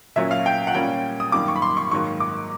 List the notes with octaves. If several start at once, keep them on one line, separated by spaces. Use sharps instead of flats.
A#2 F#3 A#3 C#4 E5
F5
G5
F#5
A#2 G3 A#3 C#4 G5
D#6
F#2 D#3 G3 A#3 D6
C#6
B5
C6
C#6
G#2 D#3 F#3 A#3 C#6
D6